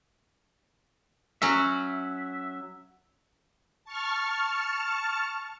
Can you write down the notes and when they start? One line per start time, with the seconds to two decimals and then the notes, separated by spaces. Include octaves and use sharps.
1.42 F#3 C#4 F#4 E5
3.84 A5 C#6 F6